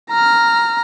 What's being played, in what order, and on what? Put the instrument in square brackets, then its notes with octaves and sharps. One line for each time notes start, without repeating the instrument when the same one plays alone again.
[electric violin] A#5 F6